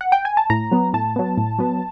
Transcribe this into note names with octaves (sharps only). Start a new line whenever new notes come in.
F#5
G5
G#5
A5
A2 A#5
F#3 B3
A2 A5
F#3 B3
A2
F#3 B3